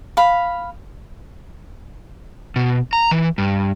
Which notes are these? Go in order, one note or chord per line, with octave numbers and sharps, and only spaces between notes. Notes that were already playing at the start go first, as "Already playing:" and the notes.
F5 B5
B2
A#5
E3
G2